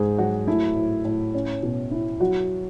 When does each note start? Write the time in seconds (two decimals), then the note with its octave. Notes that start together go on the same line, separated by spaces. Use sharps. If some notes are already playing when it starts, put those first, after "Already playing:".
Already playing: G#2 D#4 G#4
0.18 F#3 F#4
0.47 A3 E4
0.76 A2
1.05 A2
1.34 C#4
1.63 B2
1.91 E4
2.20 F#3 F#4